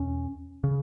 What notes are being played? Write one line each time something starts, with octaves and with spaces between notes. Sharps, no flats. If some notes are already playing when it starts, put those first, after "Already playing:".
Already playing: E2 B2 C#4
C#3